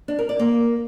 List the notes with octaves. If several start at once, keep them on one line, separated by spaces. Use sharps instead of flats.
D4
A#4
D5
A#3